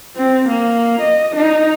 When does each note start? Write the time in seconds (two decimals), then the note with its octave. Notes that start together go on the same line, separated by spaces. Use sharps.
0.16 C4
0.49 A#3
1.02 D#5
1.36 D#4